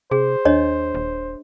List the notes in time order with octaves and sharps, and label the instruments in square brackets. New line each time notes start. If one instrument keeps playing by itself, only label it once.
[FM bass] C3 [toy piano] G#4 [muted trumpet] C5
[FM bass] D#2 [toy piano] D4 C#5 D#5
[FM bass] D#1